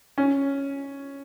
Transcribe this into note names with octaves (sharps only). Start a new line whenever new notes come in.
C#4